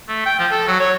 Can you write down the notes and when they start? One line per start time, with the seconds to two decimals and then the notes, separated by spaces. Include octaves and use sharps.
0.09 A3
0.26 G5
0.39 F3
0.51 A4
0.68 F#3
0.80 C#5